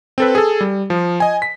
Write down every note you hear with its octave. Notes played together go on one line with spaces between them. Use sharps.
C4 A4 B4
G#4 A4
G3
F3
D#5 G#5
B6